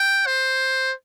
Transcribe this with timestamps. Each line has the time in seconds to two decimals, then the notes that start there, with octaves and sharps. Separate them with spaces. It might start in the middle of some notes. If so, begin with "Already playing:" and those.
Already playing: G5
0.26 C5